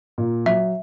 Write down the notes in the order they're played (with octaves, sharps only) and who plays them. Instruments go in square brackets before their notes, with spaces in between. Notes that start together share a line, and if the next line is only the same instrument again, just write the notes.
[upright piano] A#2
[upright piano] F#3 [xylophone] E5